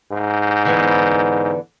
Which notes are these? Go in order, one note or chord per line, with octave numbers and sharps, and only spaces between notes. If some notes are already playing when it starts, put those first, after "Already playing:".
G#2
D3 E3 B3